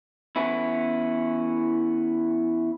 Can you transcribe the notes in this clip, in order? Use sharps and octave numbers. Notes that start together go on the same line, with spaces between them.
E3 B3 C#4 E4